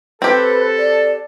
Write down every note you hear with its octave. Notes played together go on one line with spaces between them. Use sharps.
C4 G4 A4 B4
D5